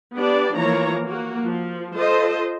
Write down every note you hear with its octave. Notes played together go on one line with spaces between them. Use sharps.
B3 D4 G4 D5
E3 F3 A#3 C#5 A#5
A#3 F#4
F3
F4 A4 C5 D#5